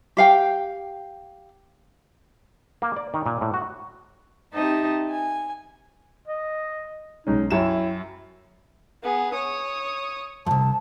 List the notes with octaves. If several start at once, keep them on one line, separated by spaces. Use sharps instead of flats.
G4 F5 G5
A#3
D5
D#3
A#2
A2
F#4
C4 D#4 G4 D#5 E5 A5
G#5
D#5
B1 G#3 C#4 D#4
F#2 E4 C#5 E5 G5 E7
B3 G#4
C#5 D#6
C2 F2 A5